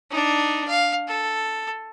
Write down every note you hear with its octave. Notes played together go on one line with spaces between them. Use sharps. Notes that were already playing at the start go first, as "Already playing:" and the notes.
D4 D#4
F5
A4